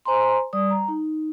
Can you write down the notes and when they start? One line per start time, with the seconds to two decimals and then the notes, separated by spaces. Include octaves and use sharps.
0.05 C5 G#5 A#5 C6
0.53 G3 D5 D#6
0.70 A#5
0.88 D#4